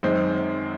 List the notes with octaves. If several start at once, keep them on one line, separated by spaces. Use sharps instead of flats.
F#2 D#3 G#3 C4